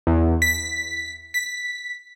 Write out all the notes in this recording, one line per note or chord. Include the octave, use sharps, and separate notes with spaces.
E2
B6
B6